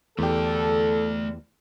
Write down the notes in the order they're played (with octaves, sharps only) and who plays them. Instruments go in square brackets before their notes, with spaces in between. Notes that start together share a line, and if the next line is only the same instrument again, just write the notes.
[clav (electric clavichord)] E2 G4 [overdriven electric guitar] A3 D5 [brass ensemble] A4